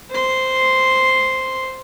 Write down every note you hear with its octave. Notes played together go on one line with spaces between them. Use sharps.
C5 C6